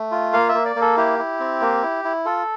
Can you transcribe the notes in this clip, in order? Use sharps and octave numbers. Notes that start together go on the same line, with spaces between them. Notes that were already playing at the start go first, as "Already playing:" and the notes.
Already playing: A3
F4
A#3 F5
E5
A#3
D5
A#3
A4
E4 G4
E4
C4
A#3
E4
E4
F4 A4